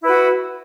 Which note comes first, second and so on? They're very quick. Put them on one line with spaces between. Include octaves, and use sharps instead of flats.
E4 B4 F#4